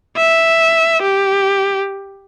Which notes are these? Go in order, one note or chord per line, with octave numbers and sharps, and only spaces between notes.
E5
G4